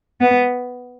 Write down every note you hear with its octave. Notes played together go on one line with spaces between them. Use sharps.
B3